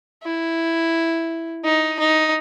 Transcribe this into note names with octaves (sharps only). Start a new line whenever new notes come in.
E4
D#4
D#4